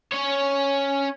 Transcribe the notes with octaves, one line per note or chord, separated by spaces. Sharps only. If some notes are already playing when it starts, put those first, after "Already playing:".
C#4 C#5